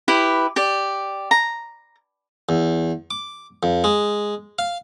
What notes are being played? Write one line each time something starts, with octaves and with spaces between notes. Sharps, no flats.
E4 G4 B4
G4 D5
A#5
E2
D6
F2
G#3
F5